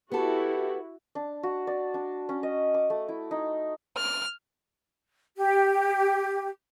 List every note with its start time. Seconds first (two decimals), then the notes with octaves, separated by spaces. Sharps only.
0.12 B3 E4 F#4 G4 A4
1.15 D4
1.43 F#4
1.67 D5
1.94 D4
2.29 C#4
2.43 D#5
2.74 D6
2.90 A3
3.09 E4
3.31 D#4
3.97 F6
5.37 G4